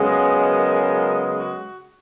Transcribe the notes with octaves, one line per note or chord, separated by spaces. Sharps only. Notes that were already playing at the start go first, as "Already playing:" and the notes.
Already playing: F#2 C#3 G#3 B3
A#4
F#4